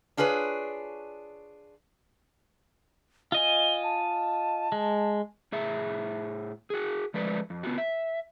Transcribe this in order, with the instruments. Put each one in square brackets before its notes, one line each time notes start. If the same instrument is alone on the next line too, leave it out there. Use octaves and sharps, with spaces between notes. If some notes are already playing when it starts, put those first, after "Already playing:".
[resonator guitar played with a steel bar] D4 F4 G#4 B4 C#5
[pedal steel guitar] F4 D#5 G#5 [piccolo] G7
[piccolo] A5
[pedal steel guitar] G#3
[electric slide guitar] A2 G#4 E5
F#4 G#4
F3 G#3 A3 B4 D5
F2
B3 F4 F#4
E5